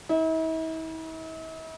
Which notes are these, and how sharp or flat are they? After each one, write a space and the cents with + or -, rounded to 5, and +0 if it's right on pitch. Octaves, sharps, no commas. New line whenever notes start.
E4 -45